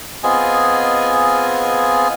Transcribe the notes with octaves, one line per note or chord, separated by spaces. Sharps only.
B3 C4 F4 G#4 D#5 G#5